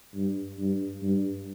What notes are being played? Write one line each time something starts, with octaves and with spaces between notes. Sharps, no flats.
G2
G2
G2